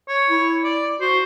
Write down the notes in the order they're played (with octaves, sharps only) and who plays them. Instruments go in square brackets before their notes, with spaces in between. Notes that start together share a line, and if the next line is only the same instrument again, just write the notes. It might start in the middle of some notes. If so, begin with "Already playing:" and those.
[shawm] C#5
[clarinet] E4
[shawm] D5
[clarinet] F#4 [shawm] C5